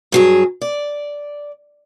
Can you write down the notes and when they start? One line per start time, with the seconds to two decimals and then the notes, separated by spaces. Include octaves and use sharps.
0.12 G2 F#3 G#4
0.62 D5